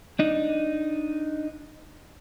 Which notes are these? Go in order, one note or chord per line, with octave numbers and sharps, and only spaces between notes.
D4 D#4